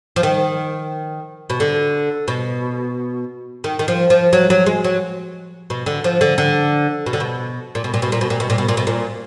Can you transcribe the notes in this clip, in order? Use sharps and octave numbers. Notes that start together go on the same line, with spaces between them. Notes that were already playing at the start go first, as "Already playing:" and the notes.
F3
D#3
B2
D3
B2
D#3
D#3
F3
F3
F#3
F#3
G#3
F#3
B2
D3
F3
D3
D3
B2
D3
B2
A#2
B2
A#2
B2
A#2
B2
A#2
B2
A#2
B2
A#2
B2
A#2